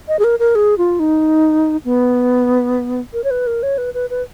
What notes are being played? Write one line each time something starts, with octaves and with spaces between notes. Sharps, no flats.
D#5
G#4
A#4
A#4
G#4
F4
D#4
B3
A#4
C#5
B4
A#4
C#5
B4
B4
B4